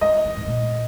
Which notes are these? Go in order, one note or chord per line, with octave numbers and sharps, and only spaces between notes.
F#3 D#5
E3
G#2
A#2